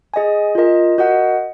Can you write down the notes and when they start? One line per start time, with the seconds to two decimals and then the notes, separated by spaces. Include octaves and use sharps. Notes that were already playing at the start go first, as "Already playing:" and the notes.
0.14 G#4 D#5 G#5
0.55 F4 A#4 D#5
0.98 F#4 A#4 D#5 F#5